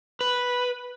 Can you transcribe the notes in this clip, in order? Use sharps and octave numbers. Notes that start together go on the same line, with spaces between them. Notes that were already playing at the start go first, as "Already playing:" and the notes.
B4